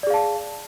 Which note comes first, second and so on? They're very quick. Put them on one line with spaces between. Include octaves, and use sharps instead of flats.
D5 G#4 F5 A5